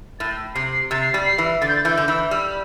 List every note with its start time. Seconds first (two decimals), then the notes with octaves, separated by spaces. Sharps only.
0.20 A2 A6
0.55 C3 C7
0.73 C7
0.91 C3 A6
1.01 C7
1.13 G3 A6
1.26 C7
1.38 E3
1.62 D3 A6
1.68 G6
1.76 A6
1.85 E3 G6
1.97 D3 G6
2.08 E3 E6
2.31 G3 E6